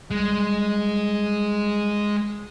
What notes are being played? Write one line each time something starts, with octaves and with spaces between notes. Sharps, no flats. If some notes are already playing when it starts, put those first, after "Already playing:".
A#1 G3 G#3